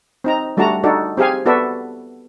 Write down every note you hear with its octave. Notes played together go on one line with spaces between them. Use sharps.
C4 D#4 A#5
G3 A3 D4 F#4 A5 A#5
D4 D#4 F#4 A4 D5
C4 G4 G#4 F5 G#5
B3 F#4 A4 B4 D5 E5